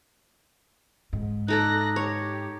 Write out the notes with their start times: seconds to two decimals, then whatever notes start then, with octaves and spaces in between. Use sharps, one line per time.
1.13 G#2
1.48 D#4 A4 D5 F#6 A#6
1.96 G4 C#5